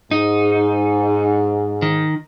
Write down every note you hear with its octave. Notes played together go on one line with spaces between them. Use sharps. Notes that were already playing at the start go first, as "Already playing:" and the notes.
G#2 D#4
D#3